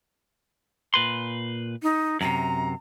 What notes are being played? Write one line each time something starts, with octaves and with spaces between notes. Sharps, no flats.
A#2 B4 C6
D#4
F#2 A2 C3 A#5